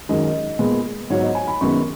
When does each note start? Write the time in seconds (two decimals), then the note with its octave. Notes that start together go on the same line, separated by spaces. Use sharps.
0.09 F#2 D#3 G#3 C#4 D#5
0.59 A#2 G#3 B3
1.10 G#2 F#3 B3 C#5
1.23 D#5
1.35 G#5
1.48 B5
1.61 F#2 D#3 G#3 B3 C#6